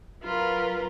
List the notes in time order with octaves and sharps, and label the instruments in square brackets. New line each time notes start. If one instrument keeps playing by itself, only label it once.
[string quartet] F#3 F4 A#4 B4